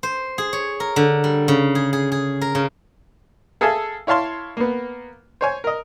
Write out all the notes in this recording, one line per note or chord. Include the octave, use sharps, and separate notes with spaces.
C5
G#4
C#5
A#4
D3
G3
C#3
G#4
G#4
G#4
A#4
C#3
G#4 A4 E5 F5 G#5 A5
E4 C#5 F5 A5 C6
A#3 B3
C5 C#5 G#5
A#4 D#5